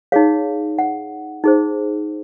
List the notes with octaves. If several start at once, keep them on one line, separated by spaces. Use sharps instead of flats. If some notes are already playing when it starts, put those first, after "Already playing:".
D#4 G#4 C#5 F5
F#5
D#4 G#4 C5